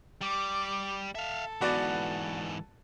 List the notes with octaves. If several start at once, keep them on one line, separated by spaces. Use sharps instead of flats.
G3 D6
A4 E5 F5
G#2 E3 B3 F#4 D5